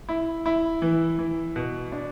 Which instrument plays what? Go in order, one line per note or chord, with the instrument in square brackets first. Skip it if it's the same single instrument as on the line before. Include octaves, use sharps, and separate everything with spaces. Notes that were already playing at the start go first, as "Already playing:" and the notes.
[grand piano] E4
E4
E3
E3
B2
D4